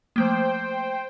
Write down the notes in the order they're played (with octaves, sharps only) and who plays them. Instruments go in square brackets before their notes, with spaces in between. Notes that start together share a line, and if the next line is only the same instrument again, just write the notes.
[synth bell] F3 A3 A#3 [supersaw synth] C5 G5